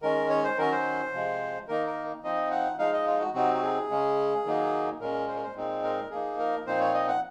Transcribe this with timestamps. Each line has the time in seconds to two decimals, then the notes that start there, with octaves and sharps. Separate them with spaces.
0.02 D#3 G#3 C#4 A#4
0.30 C#5
0.44 C5
0.57 D#3 F#3 C#4 A#4
0.72 C5
1.13 C3 F3 G#3
1.68 D#3 A#3 D#4 A#4
1.87 A#4
2.24 F3 C4 D#4 D#5
2.51 F#5
2.78 F3 G#3 D#4 F5
2.93 D#5
3.06 F4
3.20 F#4
3.34 C3 F#3 C4 D#4 F#4
3.54 F#4
3.62 G#4
3.90 C#3 G#3 C#4
4.45 D#3 F#3 A#3 D#4
5.00 A#2 G#3 C#4 A#4
5.28 C5
5.35 A#4
5.43 C5
5.56 A#2 G#3 C4 D#4
5.84 A#4
6.11 F3 A#3 D#4 G#4
6.39 A#4
6.66 A#2 F3 C4 D#4 C5
6.80 C#5
6.94 D#5
7.08 F#5